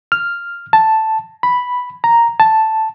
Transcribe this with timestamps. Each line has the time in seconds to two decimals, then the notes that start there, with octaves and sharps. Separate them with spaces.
0.12 F6
0.73 A5
1.43 B5
2.04 A#5
2.40 A5